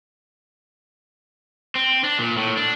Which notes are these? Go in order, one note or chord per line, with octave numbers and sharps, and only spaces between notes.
C4
D4
A#2
A2
D4